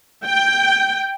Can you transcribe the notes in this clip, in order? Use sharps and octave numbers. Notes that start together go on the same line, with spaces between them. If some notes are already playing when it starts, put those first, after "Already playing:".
G5